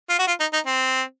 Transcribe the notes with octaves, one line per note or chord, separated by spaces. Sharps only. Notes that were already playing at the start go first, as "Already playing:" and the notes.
F4
F#4
F4
D#4
D#4
C4